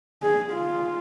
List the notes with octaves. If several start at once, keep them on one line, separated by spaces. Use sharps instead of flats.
G#4
F4